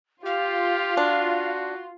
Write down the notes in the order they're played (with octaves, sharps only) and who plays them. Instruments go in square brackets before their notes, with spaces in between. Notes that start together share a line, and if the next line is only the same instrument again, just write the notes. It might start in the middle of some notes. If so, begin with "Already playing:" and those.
[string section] F4 [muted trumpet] G4 [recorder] F5
[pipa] D4 [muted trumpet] F#4